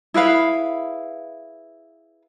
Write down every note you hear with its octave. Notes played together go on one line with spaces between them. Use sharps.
E4 G#4 B4 F5